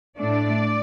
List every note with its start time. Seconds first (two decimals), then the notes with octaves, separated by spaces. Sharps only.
0.18 A2 A3 D4 D5